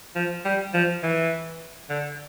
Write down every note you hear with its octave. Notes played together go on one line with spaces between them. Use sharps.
F3
G3
F3
E3
D3